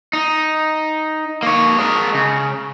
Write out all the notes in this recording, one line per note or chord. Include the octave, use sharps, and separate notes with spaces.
D#4
A#3 C#5
G#3 A#4
C#3